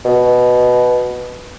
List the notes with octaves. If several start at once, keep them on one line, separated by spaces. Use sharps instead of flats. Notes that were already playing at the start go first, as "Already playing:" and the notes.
B2